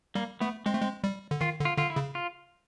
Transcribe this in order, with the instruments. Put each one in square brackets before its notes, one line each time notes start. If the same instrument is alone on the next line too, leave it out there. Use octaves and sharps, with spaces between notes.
[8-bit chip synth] G3 [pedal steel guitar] A#3
[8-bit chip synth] A3 [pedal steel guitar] B3
[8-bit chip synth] G#3 [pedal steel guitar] C4
[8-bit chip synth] A3
G#3
G3
D3
[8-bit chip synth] D#3 [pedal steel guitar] F4
[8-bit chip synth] D3
[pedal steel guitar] F4
[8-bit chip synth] D3 [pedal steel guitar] F4
[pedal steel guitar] E4
[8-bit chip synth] C#3
[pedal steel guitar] F4